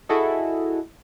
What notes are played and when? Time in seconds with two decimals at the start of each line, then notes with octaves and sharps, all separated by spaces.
0.09 E4 F#4 G#4 A4 D#5